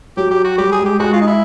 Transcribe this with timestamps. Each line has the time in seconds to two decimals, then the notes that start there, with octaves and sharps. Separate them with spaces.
0.17 F#3 G4
0.31 G4
0.45 F#4
0.58 G3 G4
0.72 G#4
0.79 G#3
0.86 G4
0.99 G#3 F#4
1.13 F4
1.21 D#4
1.27 E4